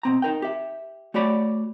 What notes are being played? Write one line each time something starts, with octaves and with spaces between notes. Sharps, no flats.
B2 C4 A#5
D#4 A#4 G5
G4 E5
A3 F#4 C#5 D5 B5